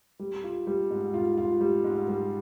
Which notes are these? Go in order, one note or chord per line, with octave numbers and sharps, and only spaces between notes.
G3
F4
G3
G#2
F4
F4
G3
G#2
G3